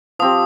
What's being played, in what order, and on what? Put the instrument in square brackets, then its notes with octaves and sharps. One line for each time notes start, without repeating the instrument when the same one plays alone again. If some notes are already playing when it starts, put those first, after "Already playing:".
[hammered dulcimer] F3 C4 G4 [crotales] D#6